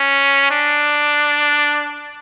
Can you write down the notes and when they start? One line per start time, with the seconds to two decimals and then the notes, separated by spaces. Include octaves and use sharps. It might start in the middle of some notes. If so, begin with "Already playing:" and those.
Already playing: C#4
0.51 D4